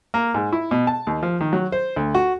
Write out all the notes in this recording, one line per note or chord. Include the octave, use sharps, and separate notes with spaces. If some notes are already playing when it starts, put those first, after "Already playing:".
A#3
G#2
E4
B2
A5
D#2
F3
D#3
F#3
C5
D2
F#4